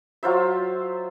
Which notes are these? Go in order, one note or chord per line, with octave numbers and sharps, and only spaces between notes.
F#3 F4 C5 E5